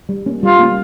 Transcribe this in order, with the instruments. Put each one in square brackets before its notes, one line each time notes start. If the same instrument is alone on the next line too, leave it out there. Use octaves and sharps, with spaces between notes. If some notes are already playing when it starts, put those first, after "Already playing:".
[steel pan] G3
A#3 C#4
[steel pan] G3 [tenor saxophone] F4
[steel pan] A#3 C#4